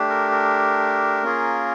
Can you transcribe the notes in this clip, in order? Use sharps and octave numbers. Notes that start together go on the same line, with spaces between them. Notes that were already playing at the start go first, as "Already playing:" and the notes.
Already playing: A3 D4 G4
A#4
A#4
A#3 C#4 F4 G#4